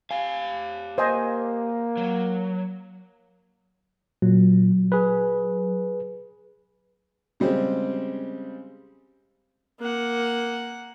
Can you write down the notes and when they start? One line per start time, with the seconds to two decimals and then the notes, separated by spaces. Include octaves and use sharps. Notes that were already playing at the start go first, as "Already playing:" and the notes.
0.11 G4 F5 G#5
0.98 A#3 C5 D#5 G#5
1.97 F#3
4.22 A#2 F#3
4.92 G#4 B4
7.40 C#3 G3 G#3 C4 C5
9.80 A#3 F#5